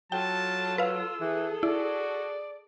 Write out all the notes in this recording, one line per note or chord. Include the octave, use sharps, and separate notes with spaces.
F#3 F4 A4 G5 A5
B4 F5 E6
E3 G#4 A4
E4 F#4 D5